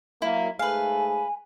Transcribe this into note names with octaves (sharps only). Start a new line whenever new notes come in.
F#3 A#3 E4
G#2 A3 G#4 B4 F5 G#5